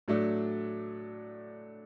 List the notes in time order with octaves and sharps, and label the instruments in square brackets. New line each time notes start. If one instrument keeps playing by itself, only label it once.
[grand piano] A2 F#3 A3 D4